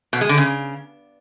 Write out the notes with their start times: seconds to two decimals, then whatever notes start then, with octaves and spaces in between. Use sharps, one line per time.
0.13 B2
0.21 G#3
0.29 D3
0.38 C#3